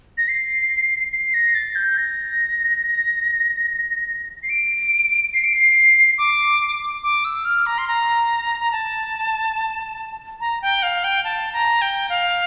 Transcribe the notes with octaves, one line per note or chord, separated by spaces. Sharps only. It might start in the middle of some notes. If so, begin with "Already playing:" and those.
A#6
C7
C7
A#6
A6
G6
A#6
C7
D7
C7
D7
C7
D6
D6
E6
F6
A#5
C6
A#5
A#5
A5
A#5
G5
F5
G5
A5
A#5
G5
F5